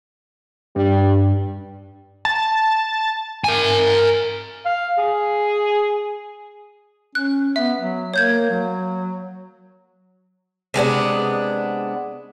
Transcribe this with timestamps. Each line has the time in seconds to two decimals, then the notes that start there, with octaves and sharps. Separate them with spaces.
0.76 G2 G3
2.25 A5
3.44 A#4 G#5
4.65 F5
4.98 G#4
7.15 C#4 F#6
7.56 B3 E5
7.81 F#3
8.14 A#3 C#5 G6 G#6
8.50 F#3
10.74 C3 G#3 B3 D4